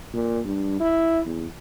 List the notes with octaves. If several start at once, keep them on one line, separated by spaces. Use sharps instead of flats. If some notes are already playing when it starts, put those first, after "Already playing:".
A#2
G2
E4
E2